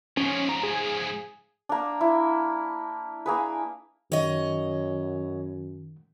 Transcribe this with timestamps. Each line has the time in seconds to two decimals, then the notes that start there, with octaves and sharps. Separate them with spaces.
0.17 G#2 F3 C#4
0.49 A#5
0.63 G#4
1.69 A#3 D4
2.01 E4
3.26 A#3 G#4 B4
4.12 F#2 D#3 C#5 D#5